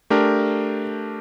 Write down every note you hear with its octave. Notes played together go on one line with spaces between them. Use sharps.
A3 D4 G4 A#4